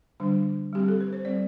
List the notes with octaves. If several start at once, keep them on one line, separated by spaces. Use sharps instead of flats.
D3 G3 D4
G3 C4 G4
A4
B4
C5
G3 C4 D5